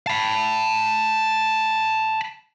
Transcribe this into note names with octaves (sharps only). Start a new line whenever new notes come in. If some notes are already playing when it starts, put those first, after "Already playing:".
A5 B5